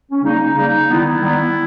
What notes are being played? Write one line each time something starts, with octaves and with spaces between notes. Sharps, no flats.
C#4
C#3 G3 A#3 D#4
C#3 G3 A#3 D#4
D#3 G3 B3 E4
D#3 G3 B3